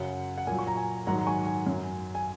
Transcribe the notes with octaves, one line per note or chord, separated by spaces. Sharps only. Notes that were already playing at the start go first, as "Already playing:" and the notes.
Already playing: F#2 C#3 F#3 F#5
F#5
A#2 F#3 G#5
C#6
A#5
G#5
G#2 D#3 F#3 F#5 A#5
A#5
G#5 C#6
G#5
F#2 F#3
G#5